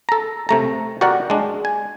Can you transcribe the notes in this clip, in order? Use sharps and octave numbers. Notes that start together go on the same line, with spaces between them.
A4 A#5
C3 A3 A#5
F#4 G4 A#4 D5 F#5
G#3 D4
G#5